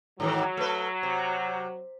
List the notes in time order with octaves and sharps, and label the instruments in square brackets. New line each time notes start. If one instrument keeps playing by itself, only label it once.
[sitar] G#2 D#3 E3 [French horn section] F#3
[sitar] A3 B4
C3